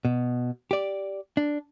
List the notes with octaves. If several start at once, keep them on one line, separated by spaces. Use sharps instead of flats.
B2
G4 D5
D4